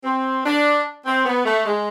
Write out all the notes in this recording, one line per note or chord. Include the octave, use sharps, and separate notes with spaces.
C4
D4
C4
B3
A3
G#3